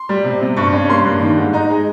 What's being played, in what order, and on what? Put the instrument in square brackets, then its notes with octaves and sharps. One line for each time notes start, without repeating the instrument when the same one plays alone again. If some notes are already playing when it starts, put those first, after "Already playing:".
Already playing: [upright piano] C6
G3
C3
C3
G2 C#6
C#4
A#3 C6
G2
D#3
G#2
D#4 A#5
G#3